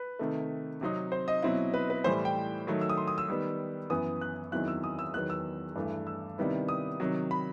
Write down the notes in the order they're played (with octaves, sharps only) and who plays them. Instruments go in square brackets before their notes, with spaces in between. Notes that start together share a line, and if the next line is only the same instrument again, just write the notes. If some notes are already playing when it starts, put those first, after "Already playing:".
Already playing: [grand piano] B4
C3 D#3 A3
C3 F#3 C4 D#4
C5
D#5
B2 F#3 C4 E4
B4
B4
A2 E3 G3 C5
G5
D#3 F#3 A3
E6
D#6
C6
D#6
E6
D#3 G3 B3
F#2 E3 B3 D#6
F#6
E2 D#3 F#3 C4 E4 F#6
E6
D#6
E6
E2 D#3 F#3 B3 F#6
E6
G2 E3 A3
E6
C3 D#3 G3 B3 E4
D#6
C3 D#3 F#3
B5